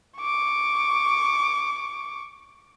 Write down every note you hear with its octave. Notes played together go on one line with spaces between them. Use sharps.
C#6 D6